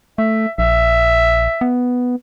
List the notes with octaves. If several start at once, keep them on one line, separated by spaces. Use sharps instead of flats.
A3 E5
A#1 E5
B3